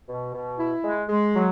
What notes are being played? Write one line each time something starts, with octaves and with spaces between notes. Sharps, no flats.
B2
B2
E4
G#3
G#3
F#3